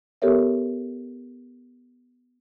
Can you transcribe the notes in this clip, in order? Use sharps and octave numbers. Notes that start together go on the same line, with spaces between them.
B3 G4 A4 A#4 C#5 E5